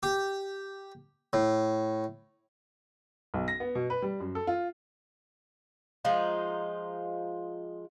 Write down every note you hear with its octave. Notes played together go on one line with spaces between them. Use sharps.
G4
A2
B1
A#6
B3
B2
B4
G3
F#2
A4
F4
F3 G#3 D#4 F4